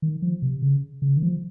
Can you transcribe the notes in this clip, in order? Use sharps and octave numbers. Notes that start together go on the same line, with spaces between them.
D#3
F3
C3
C#3
C#3
D#3
F3